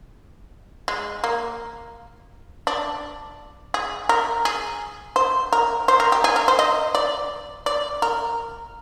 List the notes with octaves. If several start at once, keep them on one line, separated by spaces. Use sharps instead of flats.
G#3
A#3
D4
G#4
A#4
G#4
C5
A#4
C5
A#4
G4
G#4
A#4
C5
D#5
D5
D5
A#4